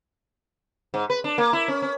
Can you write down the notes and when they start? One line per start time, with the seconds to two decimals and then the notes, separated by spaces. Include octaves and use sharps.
0.94 G#2
1.10 B4
1.24 D4
1.38 A#3
1.53 E4
1.68 C#4
1.82 C#4